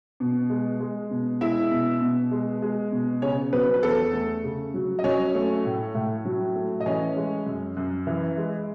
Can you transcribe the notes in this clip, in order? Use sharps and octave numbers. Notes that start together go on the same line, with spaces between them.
B2
G#3
G#3
B2
G#3 E4 E5
B2
B2
G#3
G#3
B2
C#3 C#4 C#5
F#3 B3 B4
B4
E2 A4
A3
C#3
F#3
D#5
F#3 C#4 C#5
A3
A2
A2
F#3
A3
D#5
E3 C#4 C#5
G#3
F#2
F#2
E3
G#3